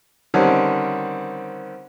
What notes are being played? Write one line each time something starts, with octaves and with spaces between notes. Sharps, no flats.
D3 D#3 G3 C4 C#4